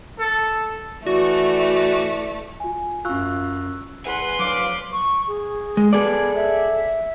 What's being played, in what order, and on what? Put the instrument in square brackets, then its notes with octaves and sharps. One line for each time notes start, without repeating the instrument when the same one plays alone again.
[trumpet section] A4
[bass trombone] E3 [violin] A3 [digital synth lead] F#4 [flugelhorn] D5
[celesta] F4 G#5
[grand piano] F#2 F5 [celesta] F4 [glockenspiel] C#6 E6 F#6
[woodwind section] E2 F#5 [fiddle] B4 C6 [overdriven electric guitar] G#5
[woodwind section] D2 F5 [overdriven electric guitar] F#3 [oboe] D6
[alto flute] C#6
G#4
[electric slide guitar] G#3
[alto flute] B3 [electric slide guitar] G#4 A4 D5
[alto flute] E5